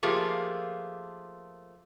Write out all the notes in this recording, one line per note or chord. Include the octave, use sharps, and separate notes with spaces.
F3 A3 A#3 F4 G4 G#4